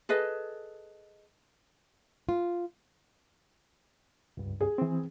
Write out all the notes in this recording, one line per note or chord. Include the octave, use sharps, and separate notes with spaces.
G#4 A4 B4 D#5
F4
C#2 G2
G#4
E3 C4